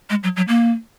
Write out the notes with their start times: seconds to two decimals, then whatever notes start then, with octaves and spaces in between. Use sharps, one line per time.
0.10 G#3
0.23 F#3
0.36 F#3
0.48 A#3